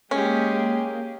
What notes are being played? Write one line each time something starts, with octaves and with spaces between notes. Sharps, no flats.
G#3 A#3 C#4 G4 G#4